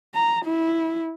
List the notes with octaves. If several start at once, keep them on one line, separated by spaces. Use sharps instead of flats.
A#5
E4